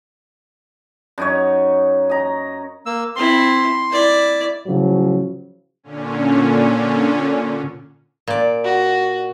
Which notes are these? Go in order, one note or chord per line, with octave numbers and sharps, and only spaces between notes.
F#2 D#4 C#5
D#5 A#5
A#3 E6
C4 E4 C6
E4 D5
A2 C#3 F3 F#3
A#2 D3 C#4
A#2 D5
F#4